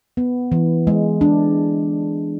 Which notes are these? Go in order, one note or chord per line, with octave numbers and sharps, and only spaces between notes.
B3
E3
G#3
D4